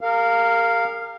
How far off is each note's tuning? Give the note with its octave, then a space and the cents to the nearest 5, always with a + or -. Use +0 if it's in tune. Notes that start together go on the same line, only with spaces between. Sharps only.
G4 +40 A#4 -25 F5 +0